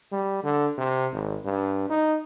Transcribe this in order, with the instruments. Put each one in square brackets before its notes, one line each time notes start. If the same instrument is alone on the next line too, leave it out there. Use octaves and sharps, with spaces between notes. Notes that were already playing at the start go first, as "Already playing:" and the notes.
[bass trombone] G3
D3
C3
G#1
G2
D#4